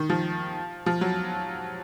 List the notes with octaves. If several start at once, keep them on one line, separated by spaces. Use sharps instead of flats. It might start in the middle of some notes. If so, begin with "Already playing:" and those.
Already playing: D#3
F3
F3
F#3